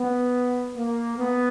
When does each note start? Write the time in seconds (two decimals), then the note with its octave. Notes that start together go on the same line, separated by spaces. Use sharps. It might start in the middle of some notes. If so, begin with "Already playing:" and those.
Already playing: B3
0.75 A#3
1.18 B3